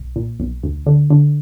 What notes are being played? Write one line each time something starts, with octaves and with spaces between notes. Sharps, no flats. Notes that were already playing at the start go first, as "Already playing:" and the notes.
Already playing: B1
A#2
B1
D2
D3
D3